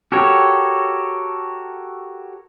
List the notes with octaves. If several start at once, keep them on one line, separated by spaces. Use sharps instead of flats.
F#4 G4 A4 A#4 C#5